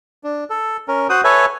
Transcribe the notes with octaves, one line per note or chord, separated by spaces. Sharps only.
D4
A4
C#4 A#4
F#4 C5 F#5 D#6
A4 B4 C#5 E5 G#5